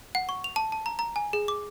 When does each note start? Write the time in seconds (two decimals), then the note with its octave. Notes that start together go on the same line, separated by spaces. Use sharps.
0.15 F#5
0.29 C#6
0.44 F7
0.56 A5
0.72 A5
0.86 A#5
0.99 A#5
1.16 G#5
1.33 G#4
1.48 D6